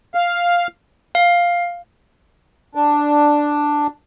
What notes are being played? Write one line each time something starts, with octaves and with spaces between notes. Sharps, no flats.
F5
F5
D4